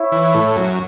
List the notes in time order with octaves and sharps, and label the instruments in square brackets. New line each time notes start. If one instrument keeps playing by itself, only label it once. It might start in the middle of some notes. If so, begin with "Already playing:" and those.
Already playing: [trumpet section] E4 C#5 E5
[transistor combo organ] E3
A2
F#2